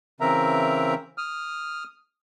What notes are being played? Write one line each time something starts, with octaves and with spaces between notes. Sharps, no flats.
C#3 E3 C4 A#4 E5 A#5
D#6 F6